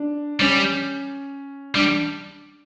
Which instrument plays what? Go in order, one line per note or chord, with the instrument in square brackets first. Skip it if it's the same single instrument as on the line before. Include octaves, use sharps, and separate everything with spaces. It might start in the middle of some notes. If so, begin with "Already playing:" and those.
Already playing: [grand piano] D4
[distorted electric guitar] G3 [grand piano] C#4
[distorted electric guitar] G3 [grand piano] D4